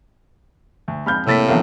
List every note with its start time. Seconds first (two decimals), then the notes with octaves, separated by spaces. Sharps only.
0.88 D2
1.06 F2 G#3 B5 F6 G6
1.27 A2 C3 A#3 E6 A6 B6
1.48 A#1 E2 D#3 F3 B3 A#4 F5